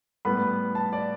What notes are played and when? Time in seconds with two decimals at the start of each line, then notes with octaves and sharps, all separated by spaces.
0.25 A2 G3 B3 B5
0.75 A5
0.93 D5